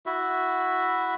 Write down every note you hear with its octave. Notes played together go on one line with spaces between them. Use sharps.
E4 F#4 E5